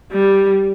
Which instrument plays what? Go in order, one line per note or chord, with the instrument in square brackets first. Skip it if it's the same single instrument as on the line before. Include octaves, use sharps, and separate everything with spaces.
[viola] G3